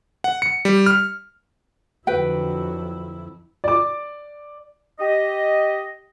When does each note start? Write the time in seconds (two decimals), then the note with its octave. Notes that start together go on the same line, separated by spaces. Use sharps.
0.24 F#5
0.42 C#7
0.65 G3
0.86 F6
2.07 F2 D3 F#3 E4 F#4 B4 G5
3.64 D5 D6
4.99 G4 D#5